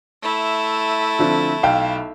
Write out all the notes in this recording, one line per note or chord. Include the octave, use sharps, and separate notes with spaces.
A3 E4
D3 F3 C4
B1 F5 G5